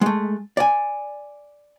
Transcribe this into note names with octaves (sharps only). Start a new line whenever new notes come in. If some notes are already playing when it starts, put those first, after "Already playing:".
G#3 A3
D5 G#5